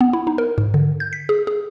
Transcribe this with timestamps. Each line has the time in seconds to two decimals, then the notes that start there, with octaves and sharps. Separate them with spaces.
0.01 B3
0.13 E4
0.27 D#4
0.38 A#4
0.58 G#2
0.74 D3
1.00 G6
1.13 B6
1.29 G#4
1.47 G#4